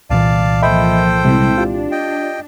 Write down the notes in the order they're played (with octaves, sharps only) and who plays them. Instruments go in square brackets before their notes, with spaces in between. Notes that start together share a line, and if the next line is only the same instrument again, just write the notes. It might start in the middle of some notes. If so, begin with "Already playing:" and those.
[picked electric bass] C2 A#2 E3 [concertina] D5 F5 A5
[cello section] F3 A#3 [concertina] A4 C5 G5 [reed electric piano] D#5 E5 B5
[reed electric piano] C3 G3 [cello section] G#3 C4 E4
[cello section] D4 [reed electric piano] F4 G4
[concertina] D#5 G5